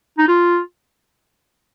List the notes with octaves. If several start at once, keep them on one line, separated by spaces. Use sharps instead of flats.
D#4
F4